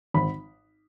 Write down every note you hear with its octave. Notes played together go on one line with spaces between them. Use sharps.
G#1 B5